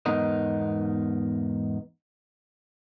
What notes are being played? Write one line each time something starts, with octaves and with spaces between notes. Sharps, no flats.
E2 G#2 B3 D#4 A#4 D#5